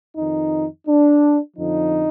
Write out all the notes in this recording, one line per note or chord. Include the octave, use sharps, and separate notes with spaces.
F2 D#3 D#4
D4
F2 D3 F3 D#4